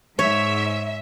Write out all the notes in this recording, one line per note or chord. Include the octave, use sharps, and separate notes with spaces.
G#2 C#5 E5